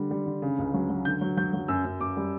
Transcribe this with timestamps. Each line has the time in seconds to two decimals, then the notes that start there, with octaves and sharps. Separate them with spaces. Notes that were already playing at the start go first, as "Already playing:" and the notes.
Already playing: D3 G3
0.11 G3
0.26 D3
0.42 C#3
0.59 C#2
0.74 F#3
0.89 F#3
1.05 D3 G6
1.21 F#3
1.37 F#3 G6
1.53 F#3
1.68 F#2 E6
1.85 F#2
2.00 F#2 D6
2.17 G3